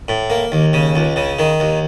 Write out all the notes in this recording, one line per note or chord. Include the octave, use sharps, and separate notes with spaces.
A2
A#3
D#2
C#3
C#2
C#3
D#3
D#2